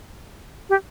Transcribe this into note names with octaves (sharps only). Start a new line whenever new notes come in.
G4